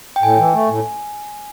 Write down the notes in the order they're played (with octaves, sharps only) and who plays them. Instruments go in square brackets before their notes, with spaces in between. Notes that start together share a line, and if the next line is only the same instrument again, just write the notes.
[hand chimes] G5
[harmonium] A2 [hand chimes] G#5
[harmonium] E3
A3
A2